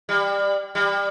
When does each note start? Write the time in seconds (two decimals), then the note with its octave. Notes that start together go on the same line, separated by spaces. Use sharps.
0.09 G3
0.75 G3